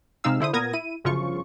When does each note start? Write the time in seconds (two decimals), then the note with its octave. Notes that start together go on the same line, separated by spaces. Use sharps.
0.24 C3 G#3 D#4 F5 E6
0.40 D3 E4 C5 D#6
0.53 A#2 B3 A#4 D#6 G#6 A#6
0.73 E4 D#7
1.04 G1 F#2 C#3 F3 F4 C#6